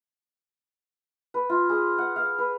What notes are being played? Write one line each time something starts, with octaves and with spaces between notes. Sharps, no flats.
B4
F4
G#4
F#5
F5
B4